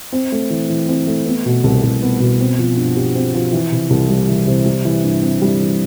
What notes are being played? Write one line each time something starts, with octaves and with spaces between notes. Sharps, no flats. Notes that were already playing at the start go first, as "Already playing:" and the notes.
C4
A3
E3
E3
C4
A3
B3
B2
C2
C2
B3
B2
C4
F3
G2
G4
C4
F3
E3
C3
C2
G3
E3
C3
G3
E3
G2
C4
G3
E3